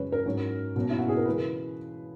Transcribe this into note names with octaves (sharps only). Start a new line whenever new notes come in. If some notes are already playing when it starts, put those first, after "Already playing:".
Already playing: F#2 C#3 G#3 C#4 B4 C#5
A#4
G#2 F#3 C#4
B2 F#3 A#3 C#4
E4
F#4
G#4
A#4
C#3 E3 G#3 C#4 B4